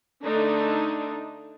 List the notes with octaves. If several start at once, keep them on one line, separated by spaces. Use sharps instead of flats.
D3 A3 D4 D#4